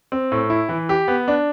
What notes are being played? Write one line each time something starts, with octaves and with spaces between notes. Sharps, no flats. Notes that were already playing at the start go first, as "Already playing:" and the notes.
C4
A2
E4
E3
G4
B3
D4